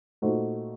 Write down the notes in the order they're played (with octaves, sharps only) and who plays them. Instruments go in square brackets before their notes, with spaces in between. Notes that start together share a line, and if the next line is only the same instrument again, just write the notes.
[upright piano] A#2 A3 D#4 F#4 C5